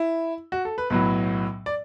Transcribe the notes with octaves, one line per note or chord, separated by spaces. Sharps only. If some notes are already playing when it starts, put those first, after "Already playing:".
Already playing: E4
F#4
A4
B4
B1 A2 F#3 B4
D5